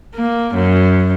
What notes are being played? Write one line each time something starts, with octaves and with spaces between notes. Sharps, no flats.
A#3
F#2